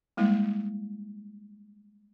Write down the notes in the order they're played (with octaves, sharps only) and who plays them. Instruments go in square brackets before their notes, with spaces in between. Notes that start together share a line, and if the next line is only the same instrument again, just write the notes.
[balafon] G3 G#3 A#3 E4